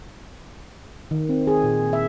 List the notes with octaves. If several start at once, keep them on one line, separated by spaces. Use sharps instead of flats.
D#3
C4
G#4
A#2
E5